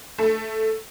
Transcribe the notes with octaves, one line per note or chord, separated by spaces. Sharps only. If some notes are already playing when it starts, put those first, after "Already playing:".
A3